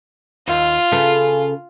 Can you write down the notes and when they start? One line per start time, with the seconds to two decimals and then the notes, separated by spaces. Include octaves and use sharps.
0.48 D#2 F4
0.92 C#3 A4 B4